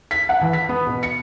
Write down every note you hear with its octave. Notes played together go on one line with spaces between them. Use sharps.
B6
F#5
E3
B6
B3
B2
C#7